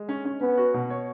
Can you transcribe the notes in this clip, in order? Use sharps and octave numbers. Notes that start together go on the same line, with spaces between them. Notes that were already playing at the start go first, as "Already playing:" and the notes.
Already playing: G#3
C#4
C#4
B3 C#4
F#4
B2
C#5